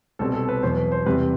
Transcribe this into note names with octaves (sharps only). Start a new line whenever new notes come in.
C2 B2 G3 C4 A4
A4
B4
E2 B2 F#3 B3 C5
B4
C5
E2 C3 G3 C4 B4